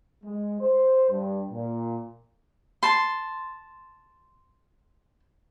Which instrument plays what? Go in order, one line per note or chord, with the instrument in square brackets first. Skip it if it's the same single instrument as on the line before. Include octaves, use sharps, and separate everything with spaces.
[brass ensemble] G#3
C5
G2
A#2
[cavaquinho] A5 C6